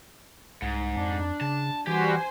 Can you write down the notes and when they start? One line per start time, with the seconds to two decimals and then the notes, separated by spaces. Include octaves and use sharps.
0.62 C2 G#2
0.96 F2 D4
1.41 C#3 A5
1.87 E3 G3 F#4 G4 C5 G#5